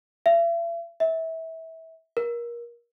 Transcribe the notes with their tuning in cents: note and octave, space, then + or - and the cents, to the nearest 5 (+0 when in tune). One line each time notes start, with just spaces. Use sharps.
E5 +45
E5 -25
A#4 +25